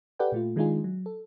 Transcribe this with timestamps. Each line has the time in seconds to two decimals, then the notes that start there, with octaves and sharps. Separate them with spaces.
0.19 G4 A4 B4 D5 F#5 G5
0.32 A#2 A3 F4
0.56 D#3 G#3 D4 D#4 F4 G#4
0.84 F#3
1.06 A4